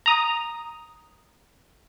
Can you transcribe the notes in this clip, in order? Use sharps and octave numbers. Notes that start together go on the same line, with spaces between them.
A#5 D#6